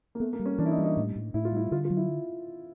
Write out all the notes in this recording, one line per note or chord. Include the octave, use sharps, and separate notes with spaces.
A#3
A3 B3
A#3
G3
C#4
E3 D4
E4
D#4
G3
D#4
A2
A2
A2 E4
F4
G3 E4
D3 F4
F4
F#3
E4